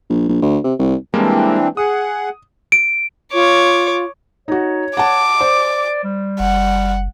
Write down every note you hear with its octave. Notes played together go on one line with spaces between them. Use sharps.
A#1
A#1
D2
C3
C2
E3 G3 G#3 A#3 C4 D4
G#4 F#5 D#6
D7
F4 C#5 D6
D#4 F#4 C#5
F#5 A5 D6
C5 D5
G3
F#1 F#5